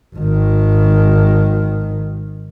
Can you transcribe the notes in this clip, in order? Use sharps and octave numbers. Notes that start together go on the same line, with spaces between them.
G#1 D#3